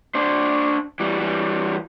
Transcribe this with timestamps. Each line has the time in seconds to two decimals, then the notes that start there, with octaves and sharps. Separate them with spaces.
0.15 D4 C5
1.00 E3 G3
1.20 E3 G3